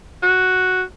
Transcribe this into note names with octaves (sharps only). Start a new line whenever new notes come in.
F#4